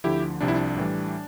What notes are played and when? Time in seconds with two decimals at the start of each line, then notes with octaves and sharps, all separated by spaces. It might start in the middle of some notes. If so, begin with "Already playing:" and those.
0.04 D2 D3 F3 E4 G4
0.41 C2 C3 F3 D4
0.48 E4
0.54 D4
0.77 A2 E3 G3